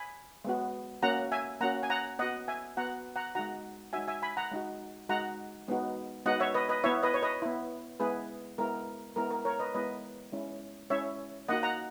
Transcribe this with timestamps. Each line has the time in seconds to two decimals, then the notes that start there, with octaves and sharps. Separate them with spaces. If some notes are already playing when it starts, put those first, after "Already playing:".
Already playing: G#5 B5
0.45 G#3 B3 F#4
1.03 A#3 C#4 F#4 F#5 A#5
1.32 E5 G#5
1.61 A#3 C#4 F#4 F#5 A#5
1.83 G#5
1.90 F#5 A#5
2.19 B3 F#4 D#5 F#5
2.48 E5 G#5
2.77 B3 F#4 F#5 A#5
3.16 F#5 A#5
3.35 G#3 D#4 F#4 F#5 A#5
3.93 G#3 D#4 F#4 E5 G#5
4.08 E5 G#5
4.22 G#5 B5
4.37 F#5 A#5
4.51 G#3 D#4 F#4
5.09 G#3 D#4 F#4 F#5 A#5
5.68 G#3 B3 D#4 F#4
6.26 G#3 B3 D#4 F#4 D#5 F#5
6.40 C#5 E5
6.54 B4 D#5
6.69 B4 D#5
6.84 B3 E4 C#5 E5
7.03 B4 D#5
7.14 C#5
7.23 B4 D#5
7.42 B3 E4
8.00 G#3 B3 E4 G#4 B4
8.58 G#3 B3 E4 A#4
9.16 G#3 B3 E4 A#4
9.31 A#4
9.45 A#4 C#5
9.59 B4 D#5
9.74 G#3 B3 E4 B4 D#5
10.32 G#3 C#4 E4
10.90 G#3 C#4 E4 C#5 E5
11.48 A#3 D#4 F#4 D#5 F#5
11.63 F#5 A#5